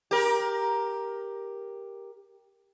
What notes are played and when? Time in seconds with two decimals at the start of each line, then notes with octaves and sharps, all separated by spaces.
0.11 G4 A#4